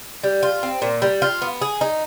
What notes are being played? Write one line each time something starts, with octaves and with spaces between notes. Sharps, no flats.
G3
F4
C4
A#2
G3
F4
B3
G#4
D#4